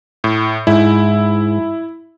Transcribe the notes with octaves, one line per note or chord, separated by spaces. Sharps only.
A2
G#2 E4